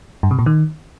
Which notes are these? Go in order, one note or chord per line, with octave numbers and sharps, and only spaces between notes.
G2
C3
A#2
D#3